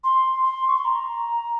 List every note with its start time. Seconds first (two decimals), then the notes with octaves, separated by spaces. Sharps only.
0.03 C6
0.44 C6
0.67 C#6
0.76 C6
0.85 A#5